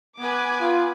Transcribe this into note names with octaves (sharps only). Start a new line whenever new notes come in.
B3 B4 G#5 D6
F4